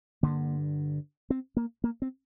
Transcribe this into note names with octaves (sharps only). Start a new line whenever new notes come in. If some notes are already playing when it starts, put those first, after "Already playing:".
G2 D3 A#3
C4
A#3
A#3
C4